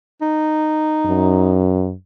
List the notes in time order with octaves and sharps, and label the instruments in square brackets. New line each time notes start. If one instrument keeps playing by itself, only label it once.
[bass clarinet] D#4
[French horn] F#2